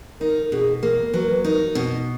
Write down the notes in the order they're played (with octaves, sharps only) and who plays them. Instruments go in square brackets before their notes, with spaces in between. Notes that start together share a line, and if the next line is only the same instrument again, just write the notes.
[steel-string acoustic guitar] D#4 [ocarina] A#4
[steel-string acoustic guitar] B2 [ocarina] G#4
[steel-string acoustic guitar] A#3 [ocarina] A#4
[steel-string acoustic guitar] F#3 [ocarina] B4
[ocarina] A#4
B4
[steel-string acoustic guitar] D#4 [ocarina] A#4
[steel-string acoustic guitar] B2